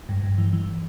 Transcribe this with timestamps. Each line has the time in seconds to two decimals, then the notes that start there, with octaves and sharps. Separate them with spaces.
0.09 G2
0.23 G2
0.38 E3
0.53 E3